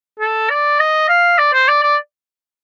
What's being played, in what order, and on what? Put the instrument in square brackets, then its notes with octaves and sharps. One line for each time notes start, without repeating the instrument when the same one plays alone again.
[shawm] A4
D5
D#5
F5
D5
C5
D5
D5